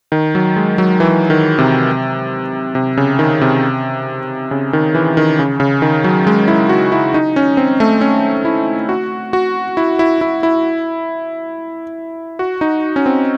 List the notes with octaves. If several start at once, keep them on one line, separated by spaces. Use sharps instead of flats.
D#3
F#3
G#3
F#3
E3
D#3
C3
C3
C#3
D#3
C3
C#3
D#3
E3
D#3
C#3
C#3
D#3
F#3
G#3
E4
F#4
E4
D#4
C#4
C4
A3
C#4
E4
F#4
F#4
E4
E4
E4
E4
F#4
D#4
C#4
C4